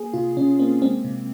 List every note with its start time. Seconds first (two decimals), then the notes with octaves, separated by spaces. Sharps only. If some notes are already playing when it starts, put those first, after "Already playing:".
Already playing: A#3 G#4
0.13 C3 F4
0.37 C3 C#4
0.59 A#3 C4
0.82 G#3 C4
1.04 C3